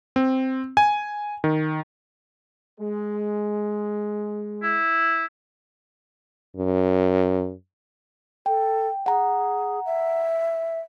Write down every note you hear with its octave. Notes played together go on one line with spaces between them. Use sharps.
C4
G#5
D#3
G#3
E4
F#2
A4 G5
G#4 F#5 A#5
E5